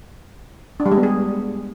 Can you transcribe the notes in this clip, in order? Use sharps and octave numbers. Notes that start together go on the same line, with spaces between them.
D4
G3
G#3
B3
G#4